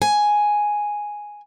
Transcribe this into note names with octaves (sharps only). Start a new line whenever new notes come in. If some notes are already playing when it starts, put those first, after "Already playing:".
G#5